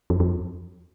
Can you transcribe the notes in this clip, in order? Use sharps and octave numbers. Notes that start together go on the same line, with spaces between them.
F2
F2